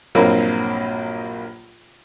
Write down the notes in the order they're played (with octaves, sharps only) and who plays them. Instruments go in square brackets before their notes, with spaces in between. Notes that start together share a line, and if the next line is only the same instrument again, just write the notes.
[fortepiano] A#1 G2 F#3 A#3 C4